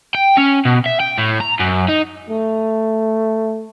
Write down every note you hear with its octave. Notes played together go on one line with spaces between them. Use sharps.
G5
C#4
B2
E5
G5
A2
A#5
F#2
D#4
A3